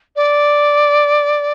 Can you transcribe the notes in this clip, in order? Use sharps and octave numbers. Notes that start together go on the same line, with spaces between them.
D5